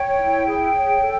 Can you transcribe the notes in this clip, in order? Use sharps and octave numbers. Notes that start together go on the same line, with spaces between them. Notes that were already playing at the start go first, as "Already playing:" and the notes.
Already playing: C#5 G5
E4
G#4
C#5
A4